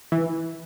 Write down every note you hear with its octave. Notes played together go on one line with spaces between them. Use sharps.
E3